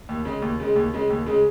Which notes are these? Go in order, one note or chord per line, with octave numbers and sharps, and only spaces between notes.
D#2
C#3 G#3
D#2
C#3 G#3
D#2
C#3 G#3
D#2
C#3 G#3